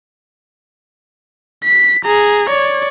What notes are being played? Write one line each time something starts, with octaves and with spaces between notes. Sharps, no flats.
B6
G#4 A#5
C#5 D5